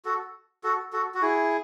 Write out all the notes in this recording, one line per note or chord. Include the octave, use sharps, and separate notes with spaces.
F#4 A4
F#4 A4
F#4 A4
F#4
E4 G#4